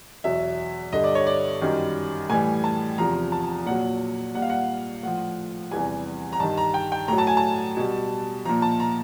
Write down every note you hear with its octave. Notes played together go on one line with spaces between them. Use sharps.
E2 B2 F#3 E5
G2 D3 G3 D#5
D5
C#5
D5
F#2 D#3 G3
A2 E3 G3 G#5
A5
E2 C3 F3 A#5
A5
A#2 F#3 F#5
A#2 G3 F#5
F5
F#5
A2 F3 F#5
E2 C3 E3 G3 G#5
A#5
G2 D#3 G3 A5
A#5
G5
G5
A2 F#3 A#5
A5
G#5
A5
B2 G3
A#2 F3 A#5
A5
A#5